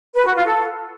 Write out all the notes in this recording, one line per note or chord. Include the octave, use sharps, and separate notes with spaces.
B4
F#4
F4
A4